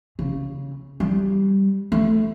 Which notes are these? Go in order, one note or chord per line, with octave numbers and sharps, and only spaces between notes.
C#3
G3
A3